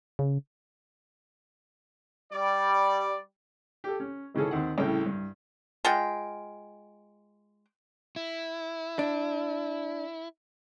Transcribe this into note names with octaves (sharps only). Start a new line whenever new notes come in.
C#3
G3 D5
G4 A4
C#4
G#1 C#3 E3 C#4 G#4 A4
D#2 C4 F#5
C2 A2 C#3 A3 G5
G2
G#3 F4 F#5 G5
E4
D4